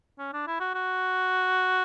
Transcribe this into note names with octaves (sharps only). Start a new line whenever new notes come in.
C#4
D4
E4
F#4
F#4